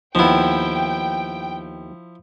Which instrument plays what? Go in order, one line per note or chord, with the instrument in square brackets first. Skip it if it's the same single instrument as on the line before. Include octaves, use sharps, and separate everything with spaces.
[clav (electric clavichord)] D#2 B3 [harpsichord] F3 E4 [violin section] G5